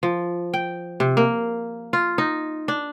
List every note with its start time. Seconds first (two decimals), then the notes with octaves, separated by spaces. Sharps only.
0.03 F3
0.54 G5
1.00 C3
1.17 A#3
1.93 F4
2.18 D#4
2.68 D4